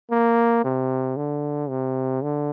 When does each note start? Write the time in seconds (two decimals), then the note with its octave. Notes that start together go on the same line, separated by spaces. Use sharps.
0.11 A#3
0.64 C3
1.17 D3
1.69 C3
2.22 D3